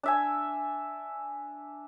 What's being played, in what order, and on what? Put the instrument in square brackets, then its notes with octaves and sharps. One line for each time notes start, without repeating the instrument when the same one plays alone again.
[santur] D4 E5 G#5